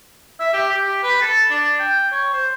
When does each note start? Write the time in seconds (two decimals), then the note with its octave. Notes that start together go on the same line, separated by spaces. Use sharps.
0.40 E5
0.53 G4
0.71 G4
1.03 B4
1.21 A4
1.50 D4
1.79 G5
2.12 C#5
2.33 C5